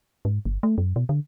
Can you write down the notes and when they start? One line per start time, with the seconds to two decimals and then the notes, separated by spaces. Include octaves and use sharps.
0.25 G#2
0.45 G1
0.63 A3
0.78 F#2
0.96 B2
1.09 D3